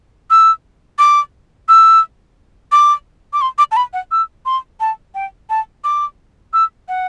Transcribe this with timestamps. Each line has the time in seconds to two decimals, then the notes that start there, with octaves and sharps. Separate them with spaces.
0.30 E6
0.99 D6
1.69 E6
2.72 D6
3.33 D6
3.41 C6
3.58 D6
3.72 A5
3.77 B5
3.93 F#5
4.11 E6
4.46 C6
4.80 A5
5.15 G5
5.50 A5
5.84 D6
6.53 E6
6.88 F#5